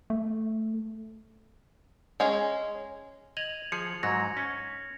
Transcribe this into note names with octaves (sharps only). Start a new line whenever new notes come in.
A3
G#3 C#4 G#4
D#5 G#6 F7 F#7
F3 G#4 C#7
G#2 F#3 G#6 A#6
C#4